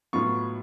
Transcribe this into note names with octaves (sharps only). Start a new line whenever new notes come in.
A2 F#3 B3 F4 C#6